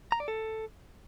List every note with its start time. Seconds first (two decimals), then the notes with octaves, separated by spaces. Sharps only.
0.12 A#5
0.20 D5
0.28 A4